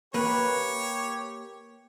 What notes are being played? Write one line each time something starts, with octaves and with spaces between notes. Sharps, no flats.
A#3 G4 B4 C#5